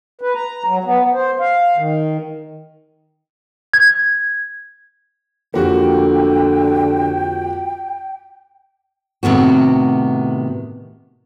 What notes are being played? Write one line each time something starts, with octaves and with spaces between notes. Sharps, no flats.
B4
A#5
F#3
B3
C5
F5
D#3
G#6
F2 D3 A#3 F#4 G4 G5
A2 C3 D#3 B3 F#4